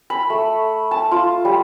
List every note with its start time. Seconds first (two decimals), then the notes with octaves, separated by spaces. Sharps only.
0.10 B5
0.30 A3
0.91 A5
1.11 F4
1.45 G3